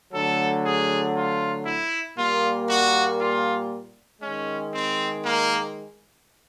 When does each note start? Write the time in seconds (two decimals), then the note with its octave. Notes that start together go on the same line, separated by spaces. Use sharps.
0.13 D3 F#3 A3 A4
0.64 G#4
1.16 F4
1.66 E4
2.17 A#2 G3 A#3 F4
2.69 F#4
3.20 F4
4.22 D#3 G#3 C#4
4.73 C4
5.24 A#3